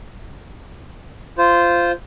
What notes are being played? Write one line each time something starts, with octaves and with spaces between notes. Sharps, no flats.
F4 C5